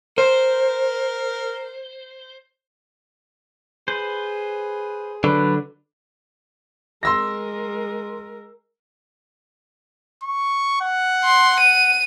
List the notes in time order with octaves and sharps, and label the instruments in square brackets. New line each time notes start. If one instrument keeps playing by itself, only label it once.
[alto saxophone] A#4 [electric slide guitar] C5
[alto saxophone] G#4 [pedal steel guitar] B4 C5
[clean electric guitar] D3 [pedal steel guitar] F#3 D4 [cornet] B4
[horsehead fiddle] G#3 A#4 [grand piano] C6 E6 A#6
[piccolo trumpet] C#6
F#5
[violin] C6
D#7